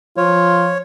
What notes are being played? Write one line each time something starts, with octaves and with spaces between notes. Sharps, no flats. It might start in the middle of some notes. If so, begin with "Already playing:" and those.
F3 F4 C#5